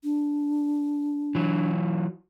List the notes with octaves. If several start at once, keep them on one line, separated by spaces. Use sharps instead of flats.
D4
E3 F#3